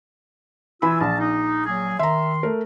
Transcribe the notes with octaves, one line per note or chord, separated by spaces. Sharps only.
E3 F4 G#5 B5 E6
A#1 A5
D#4
F#3 A#3 G#4
D#3 E5 A#5 C6
A3 A#4